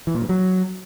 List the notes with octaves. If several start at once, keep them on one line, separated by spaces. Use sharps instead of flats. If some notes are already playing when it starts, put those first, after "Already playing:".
E3
A#2
G2
F#3